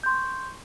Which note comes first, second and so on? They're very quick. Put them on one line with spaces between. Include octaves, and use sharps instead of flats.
G6 C6 C#6